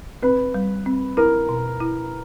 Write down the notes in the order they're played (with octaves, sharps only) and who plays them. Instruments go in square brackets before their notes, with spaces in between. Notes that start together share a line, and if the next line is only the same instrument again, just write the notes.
[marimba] C4 [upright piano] B4
[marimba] G3
C4
[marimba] E4 [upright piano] A#4
[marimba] B2
E4